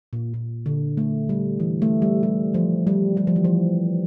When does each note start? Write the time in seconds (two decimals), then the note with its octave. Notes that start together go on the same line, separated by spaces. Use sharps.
0.13 A#2
0.34 A#2
0.66 D3
0.97 A3
1.29 G3
1.60 E3
1.82 A3
2.02 G3
2.23 G3
2.54 F3
2.87 G3
3.17 G3
3.27 F3
3.36 E3
3.44 F3